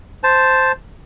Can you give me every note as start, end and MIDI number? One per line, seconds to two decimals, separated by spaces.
0.24 0.72 72
0.24 0.72 81